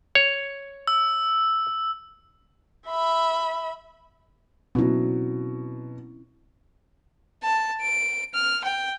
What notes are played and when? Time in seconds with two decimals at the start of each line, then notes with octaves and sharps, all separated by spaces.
0.15 C#5
0.87 E6
2.87 E5 B5
4.75 B2 F#3 C4 C#4 E4
7.43 A5
7.82 D7
8.34 F6
8.64 G5